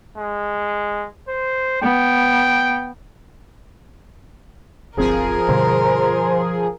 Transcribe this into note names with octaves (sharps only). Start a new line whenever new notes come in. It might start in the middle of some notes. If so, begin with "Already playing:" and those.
G#3
C5
B3 G5
D1 G1 F3 C4 G#4 A#4
G2 B2 D3 C5